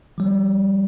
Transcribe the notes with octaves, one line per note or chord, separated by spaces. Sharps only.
F3 G3